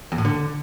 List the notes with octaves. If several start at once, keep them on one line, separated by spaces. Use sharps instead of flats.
E2
A2
D3